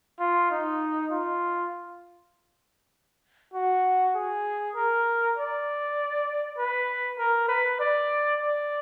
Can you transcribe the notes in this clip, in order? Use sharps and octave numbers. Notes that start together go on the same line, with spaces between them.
F4
D#4
F4
F#4
G#4
A#4
D5
B4
A#4
B4
D5
D5